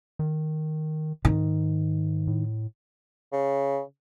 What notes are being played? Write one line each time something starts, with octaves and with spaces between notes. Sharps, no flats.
D#3
G#2 D#3
A2
C#3